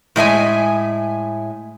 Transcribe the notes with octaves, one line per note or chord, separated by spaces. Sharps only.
A2 G#3 E5 G#5